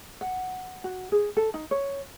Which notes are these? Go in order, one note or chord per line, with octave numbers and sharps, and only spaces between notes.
F#5
F#4
G#4
A4
D#4
C#5